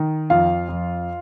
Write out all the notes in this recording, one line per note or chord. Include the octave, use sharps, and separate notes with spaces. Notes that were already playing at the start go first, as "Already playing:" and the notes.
Already playing: D#3
F2 F4 F5
F2